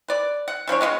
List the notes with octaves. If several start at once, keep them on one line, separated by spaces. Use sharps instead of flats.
B4 D5
F#5
E3 F3 D4 C#5
G#3 B3 F4 F#4